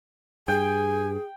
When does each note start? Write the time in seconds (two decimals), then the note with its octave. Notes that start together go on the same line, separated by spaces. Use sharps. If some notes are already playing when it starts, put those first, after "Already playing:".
0.48 G2 G#4 G5 G#5